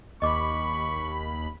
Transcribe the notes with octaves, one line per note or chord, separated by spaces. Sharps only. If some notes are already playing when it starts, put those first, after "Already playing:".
D#2 D#5 B5 C#6 D6